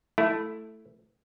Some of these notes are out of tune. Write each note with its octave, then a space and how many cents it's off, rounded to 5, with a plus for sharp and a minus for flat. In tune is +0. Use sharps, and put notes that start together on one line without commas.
A3 +0 E4 +0